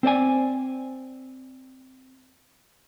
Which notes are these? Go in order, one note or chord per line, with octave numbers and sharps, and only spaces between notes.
C4 C5 D5 G#5